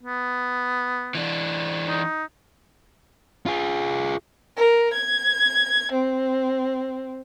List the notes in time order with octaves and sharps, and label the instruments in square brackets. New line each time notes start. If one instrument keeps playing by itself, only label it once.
[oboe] B3
[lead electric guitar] E3 D4
[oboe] D#4
[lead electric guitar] F4 G#4
[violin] A#4
G#6
C4